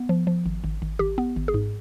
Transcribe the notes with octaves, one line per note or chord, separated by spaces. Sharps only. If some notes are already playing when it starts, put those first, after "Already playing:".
Already playing: B3
F3
F3
G#1
G#1
G#1
G#1 G4
B3
G#1
G#4
G#2